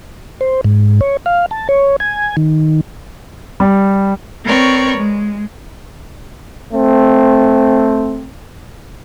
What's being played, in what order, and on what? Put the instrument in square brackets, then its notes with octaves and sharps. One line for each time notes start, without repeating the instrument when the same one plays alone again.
[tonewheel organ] C5
G#2
C#5
F5
A5
C#5
G#5
D#3
[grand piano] G3
[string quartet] C4 A#4 B4 C#5 D5 C#6
G#3
[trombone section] A3 C4